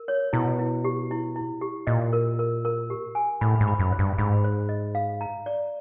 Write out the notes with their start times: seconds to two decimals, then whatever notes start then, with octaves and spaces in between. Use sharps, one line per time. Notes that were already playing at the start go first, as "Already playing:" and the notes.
Already playing: A#4
0.08 C#5
0.33 B2 E4
0.59 E4
0.84 G4
1.11 E4
1.36 E4
1.61 G4
1.87 A#2 D#5
2.13 A#4
2.39 A#4
2.65 A#4
2.90 G4
3.15 G#5
3.41 A2 B5
3.61 G#2
3.67 B5
3.80 F#2
3.92 C5
3.99 G2
4.18 G#2 B5
4.44 C5
4.69 D#5
4.95 F5
5.21 A#5
5.46 D5